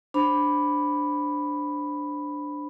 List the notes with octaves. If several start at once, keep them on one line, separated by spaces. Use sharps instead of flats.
D4 C5 B5